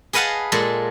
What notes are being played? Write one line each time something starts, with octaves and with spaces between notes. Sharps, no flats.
G#4 B4 D#5 F5 F#5 A5
A#2 G#3 A4